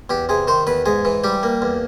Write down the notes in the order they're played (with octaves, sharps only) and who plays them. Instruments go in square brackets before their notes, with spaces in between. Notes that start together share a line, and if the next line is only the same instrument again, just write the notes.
[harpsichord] E2 G4
C3 G#4
D#3 C5
E2 B4
G#2 G#4
E3
G3 G4
A#3
E2